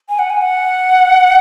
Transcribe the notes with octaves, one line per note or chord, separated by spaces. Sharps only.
G#5
F#5
G#5
F#5